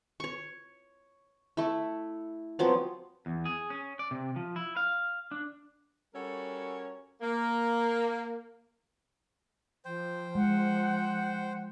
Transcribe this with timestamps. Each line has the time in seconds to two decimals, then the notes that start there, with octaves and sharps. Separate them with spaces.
0.20 C#5 C#6
1.57 A3 E4
2.59 F3 F#3 B3 C4
3.26 E2
3.45 G#4
3.70 C#4
3.99 D5
4.11 C3
4.36 F3
4.56 E4
4.77 F5
5.31 D4
6.14 G3 C#4 F#4 A4 A#4 C#5
7.22 A#3
9.85 F3 C5 G5
10.35 G#3 F#5